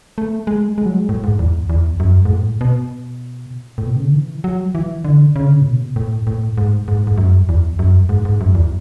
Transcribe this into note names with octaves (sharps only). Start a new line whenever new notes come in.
A3
G#3
G#3
F#3
G#3
A2
G#2
E2
E2
F#2
G#2
A2
B2
A2
B2
C#3
D3
E3
F#3
E3
D3
C#3
D3
C#3
A2
B2
A2
A2
G#2
G#2
G#2
F#2
E2
F#2
G#2
G#2
F#2
E2